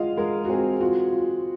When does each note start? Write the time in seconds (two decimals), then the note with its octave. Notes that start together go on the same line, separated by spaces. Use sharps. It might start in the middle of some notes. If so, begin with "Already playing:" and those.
Already playing: G#3 F4 D#5 F5 F#5
0.17 G#3 A#4
0.45 F#4
0.49 C4 G#4
0.81 F4 F#4
1.13 F4